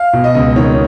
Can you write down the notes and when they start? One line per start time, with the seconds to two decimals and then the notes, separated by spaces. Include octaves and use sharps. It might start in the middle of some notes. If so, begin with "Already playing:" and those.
Already playing: F5
0.13 B2
0.24 D#5
0.35 C#2
0.56 D#3 C#5